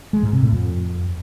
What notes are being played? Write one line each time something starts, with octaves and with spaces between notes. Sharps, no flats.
G#3
G#2
C3
A2
F2